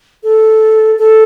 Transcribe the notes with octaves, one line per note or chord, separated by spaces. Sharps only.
A4
A4